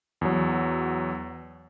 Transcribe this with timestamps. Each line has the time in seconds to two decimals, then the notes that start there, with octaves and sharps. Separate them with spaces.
0.21 E2 F#3